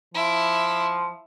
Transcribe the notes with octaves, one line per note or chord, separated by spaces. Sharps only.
F3 E4